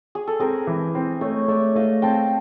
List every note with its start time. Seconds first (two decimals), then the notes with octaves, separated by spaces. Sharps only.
0.15 G#4
0.27 A4
0.40 C4 G#4 A#4
0.67 E3
0.95 C4
1.21 A3 C#5 D#5
1.48 A3 D5 E5
1.75 A3 D#5 F5
2.02 C4 G5 A5